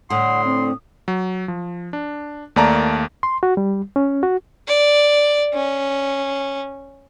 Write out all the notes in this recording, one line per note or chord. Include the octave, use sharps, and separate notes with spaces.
A2 D3 F#5 C6 D#6
C4
F#3
F3
D4
D#2 A3 A#3 D5 A5 A#5
C6
F#4
G3
C#4
F#4
D5
C#4